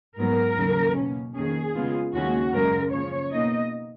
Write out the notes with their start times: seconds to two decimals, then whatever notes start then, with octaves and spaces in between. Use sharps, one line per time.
0.17 G#2 F#3 B3 A#4
0.57 D#2 C#3 F#3
0.96 B2 A#3 C#4
1.34 F2 D#3 A#3 C#4 G#4
1.74 C#3 G#3 B3 F4
2.13 D#2 C#3 G#3 C#4 F#4
2.52 F#2 C#3 G#3 A#4
2.92 C#3 F3 A#3 C#5
3.31 B2 A#3 D#4 D#5